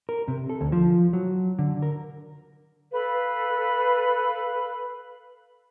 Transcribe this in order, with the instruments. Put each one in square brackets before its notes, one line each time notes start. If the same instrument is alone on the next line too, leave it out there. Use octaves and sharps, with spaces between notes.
[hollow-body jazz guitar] A#4
C3
A4
D2
F3
F#3
D3
A#4
[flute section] A4 B4 F5 B5